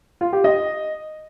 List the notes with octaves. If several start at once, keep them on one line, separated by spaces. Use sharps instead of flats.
F4
G4
D#5